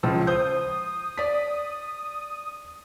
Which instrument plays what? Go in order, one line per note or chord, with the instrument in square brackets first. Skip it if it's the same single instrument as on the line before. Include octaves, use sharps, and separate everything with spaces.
[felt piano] C#2 F3 E6
[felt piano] C5 G6 [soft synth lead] D#6
[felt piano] D5 B6